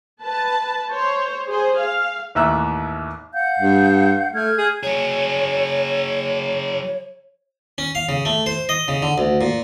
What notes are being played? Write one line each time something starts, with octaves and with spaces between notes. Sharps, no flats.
B4 A5
C5 C#5
G#4 C5
F5
A1 D#2 E5 E6 F#6
F5 F#5 G6
G2
A3 F6 G6 G#6
G#4
F#3 G#4 C#5
C#4
F5
C#3
A3
C5
D#5
C#3
D3
D2
A#2